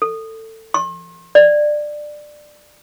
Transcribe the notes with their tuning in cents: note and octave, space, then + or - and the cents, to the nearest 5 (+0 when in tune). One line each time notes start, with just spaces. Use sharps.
A4 +20
C6 +45
D5 +15